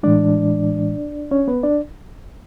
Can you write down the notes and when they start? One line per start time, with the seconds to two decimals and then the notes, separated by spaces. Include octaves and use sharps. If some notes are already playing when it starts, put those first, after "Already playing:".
0.03 A2 E3 G#3 D4 D5
1.31 C#4 C#5
1.48 B3 B4
1.63 D4 D5